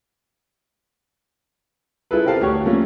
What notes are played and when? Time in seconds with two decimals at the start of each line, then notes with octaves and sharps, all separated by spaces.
2.11 E4 F4 G#4 A4 B4
2.25 C4 G4 A#4 F5 A5
2.41 D2 G4 C#5
2.65 F3 A3 A#3 C#4